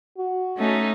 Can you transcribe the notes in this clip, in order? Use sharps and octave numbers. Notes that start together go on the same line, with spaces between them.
F#4
A3 C#4 D#4